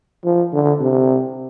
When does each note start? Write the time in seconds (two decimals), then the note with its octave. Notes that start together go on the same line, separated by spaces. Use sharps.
0.24 F3
0.53 D3
0.80 C3